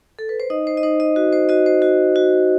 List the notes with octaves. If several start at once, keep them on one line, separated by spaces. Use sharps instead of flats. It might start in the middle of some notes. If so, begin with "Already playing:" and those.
A4
B4
C5
D#4 D#5
C5
D#5
D#4 C5
D#5
F#4
C5
F#4 D#5
C5
F#4
F#4